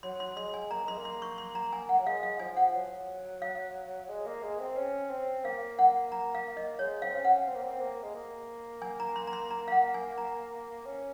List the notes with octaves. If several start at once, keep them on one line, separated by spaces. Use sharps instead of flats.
F#3 C6
C6
G#3 C6
G#5
A#3 A#5
G#3 C6
A#3
C6
C#6
C6
A#5
G#5
F#5
F#3
G#3 F5
F5
F3 G#5
F#5
F#3
F5
G#3
A#3
G#3
C4
C#4
C4
A#3 F5
F#5
A#5
F5
D#5
G#3 C#5
C4 F5
C#4
F#5
C4
A#3
C4
A#3
G#3
A#3
G#5
A#5
C6
A#5
C6
A#5
F5
F#5
G#5
A#5
C#4